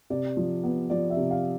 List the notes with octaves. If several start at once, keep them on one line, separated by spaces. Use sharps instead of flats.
C3 D5
F3
B3
F3 D5
E5
C3
F5